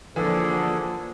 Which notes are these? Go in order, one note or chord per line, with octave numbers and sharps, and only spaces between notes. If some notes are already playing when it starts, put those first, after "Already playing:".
D3 E3 F3 A#3 G#4 A4